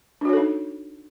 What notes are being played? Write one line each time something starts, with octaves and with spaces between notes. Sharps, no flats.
D4 D#4 F#4 A4 C#5